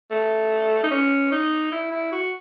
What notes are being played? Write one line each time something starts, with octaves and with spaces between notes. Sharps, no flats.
A3
D#4
C#4
D#4
E4
E4
F#4